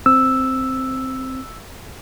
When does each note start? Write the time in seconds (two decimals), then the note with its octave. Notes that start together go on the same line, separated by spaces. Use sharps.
0.06 C4 E6